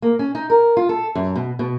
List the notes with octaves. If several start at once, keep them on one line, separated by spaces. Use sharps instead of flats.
A#3
C#4
D#4
A#4
F4
A4
F#2
B2
B2